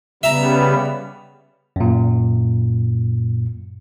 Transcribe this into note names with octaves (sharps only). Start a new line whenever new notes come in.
C#3 G3 B3 E5 A#5
F#2 A#2